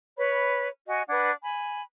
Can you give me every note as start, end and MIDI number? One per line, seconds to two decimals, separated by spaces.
0.17 0.68 71
0.17 0.68 73
0.17 0.68 83
0.87 1.03 66
0.87 1.03 75
0.87 1.03 80
1.08 1.30 62
1.08 1.30 71
1.08 1.30 78
1.08 1.30 92
1.44 1.80 80
1.44 1.80 83